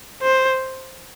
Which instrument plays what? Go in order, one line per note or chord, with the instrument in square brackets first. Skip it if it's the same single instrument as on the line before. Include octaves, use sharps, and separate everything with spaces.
[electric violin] C5